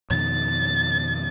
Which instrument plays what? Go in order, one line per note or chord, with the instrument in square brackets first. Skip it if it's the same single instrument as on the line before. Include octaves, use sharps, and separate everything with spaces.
[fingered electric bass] F2 B2 D#3 [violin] A6